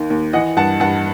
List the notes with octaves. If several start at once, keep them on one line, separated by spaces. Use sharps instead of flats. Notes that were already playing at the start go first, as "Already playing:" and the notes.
Already playing: D#2 D#3
D#2
E3 D#5 F#5
G2 F#5 A5
G2 F#5 A5